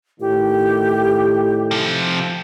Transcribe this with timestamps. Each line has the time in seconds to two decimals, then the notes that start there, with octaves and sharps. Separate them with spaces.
0.20 A2 D#3 G4
1.71 C3 F3